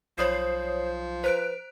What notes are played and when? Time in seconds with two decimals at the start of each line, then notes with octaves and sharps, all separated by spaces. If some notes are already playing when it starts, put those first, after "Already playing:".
0.18 B1 F3 C5 C#5 D#6 C7
1.24 B4 C5 F#6 D7